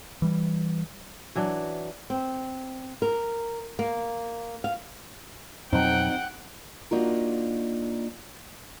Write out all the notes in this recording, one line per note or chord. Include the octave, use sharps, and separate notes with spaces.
E3 G3
E3 F#3 D4
C4
A#4
A#3
F5
F2 B2 F#3 C4 D#4 F#5 G5
A#3 D4 D#4 F4 F#4 A#4